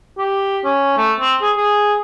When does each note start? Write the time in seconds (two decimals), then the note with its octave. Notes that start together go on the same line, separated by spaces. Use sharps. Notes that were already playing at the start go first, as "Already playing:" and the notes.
0.18 G4
0.65 C#4
0.97 A3
1.20 C4
1.42 G#4
1.57 G#4